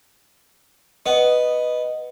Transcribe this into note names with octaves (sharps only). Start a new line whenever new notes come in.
B3 D#5